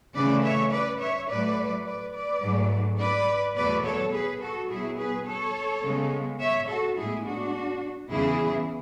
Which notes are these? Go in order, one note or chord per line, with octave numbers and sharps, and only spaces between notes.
C#3 E3 A3 B4 D5
C#5 E5
B4 D5
C#5 E5
A2 F#3 A3 B4 D5
B4 D5
B4 D5
G#2 F#3 A3
B4 D5
E2 B2 F#3 A3 B4 D5
A4 C#5
G#4 B4
F#4 A4
B2 F#3 B3 E4 G#4
G#4 B4
A4 C#5
C#3 G#3 B3
C#5 E5
F#4 A4
A2 G#3 B3 E4 G#4
D4 F#4
E2 C#3 E3 E4 G#4